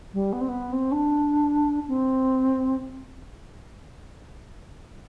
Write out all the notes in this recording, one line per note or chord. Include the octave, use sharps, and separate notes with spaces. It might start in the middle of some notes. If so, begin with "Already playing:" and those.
G3
B3
C4
B3
C4
D4
C4